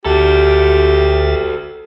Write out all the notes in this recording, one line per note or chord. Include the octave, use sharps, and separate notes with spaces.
D2 F#4 G4 A4 E5 A6